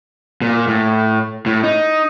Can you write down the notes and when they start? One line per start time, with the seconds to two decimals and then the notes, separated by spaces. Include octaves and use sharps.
0.42 A#2
0.68 A2
1.46 A2
1.63 D#4